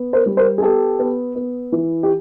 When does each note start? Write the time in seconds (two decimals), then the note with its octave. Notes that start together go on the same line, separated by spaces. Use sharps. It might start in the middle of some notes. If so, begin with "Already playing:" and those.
Already playing: B3
0.13 A#4 C5
0.26 G3
0.37 A#4 C5
0.58 G#4
0.62 B3 G4 A4
0.99 B3
1.35 B3
1.72 E3
2.03 G4